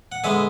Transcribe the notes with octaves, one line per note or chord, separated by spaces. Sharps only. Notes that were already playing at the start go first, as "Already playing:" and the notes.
F#5
D3 G#3 B3 E5 G#5